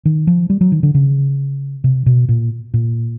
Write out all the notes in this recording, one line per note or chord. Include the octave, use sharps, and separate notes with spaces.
D#3
F3
G3
F#3
D#3
D3
C#3
C3
B2
A#2
A#2